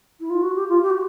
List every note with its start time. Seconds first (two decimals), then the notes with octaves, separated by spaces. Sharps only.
0.20 E4
0.30 F4
0.43 F#4
0.56 G4
0.69 F4
0.82 G4
0.90 F#4